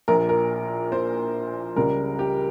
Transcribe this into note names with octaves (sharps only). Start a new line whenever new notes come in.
A#1 A#2 F3 A#4
A#4
C5
C#2 C#3 G3 A#4
G4